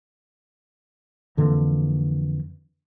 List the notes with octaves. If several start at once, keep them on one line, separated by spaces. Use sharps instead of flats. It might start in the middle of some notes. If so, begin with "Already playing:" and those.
F2 D3 E3 A#3